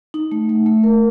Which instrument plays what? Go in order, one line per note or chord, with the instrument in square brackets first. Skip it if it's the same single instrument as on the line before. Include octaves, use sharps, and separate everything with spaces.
[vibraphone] D#4
A3
A3
A3
A#4